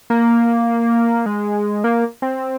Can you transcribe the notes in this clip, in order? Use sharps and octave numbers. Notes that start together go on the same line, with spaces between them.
A#3
G#3
A#3
C4